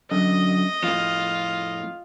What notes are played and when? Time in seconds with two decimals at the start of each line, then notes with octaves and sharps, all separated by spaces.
0.11 F#2 D3 D#5
0.83 F2 A2 F4